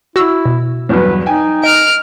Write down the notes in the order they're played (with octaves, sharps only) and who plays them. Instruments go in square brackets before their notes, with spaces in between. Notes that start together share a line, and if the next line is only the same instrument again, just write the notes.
[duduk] E4 [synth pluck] F#4 E6
[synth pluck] B2
[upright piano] E2 G2 F#3 [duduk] B4
[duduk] D#4 [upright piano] G5 G#5
[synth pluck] D#5 [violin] F6 D7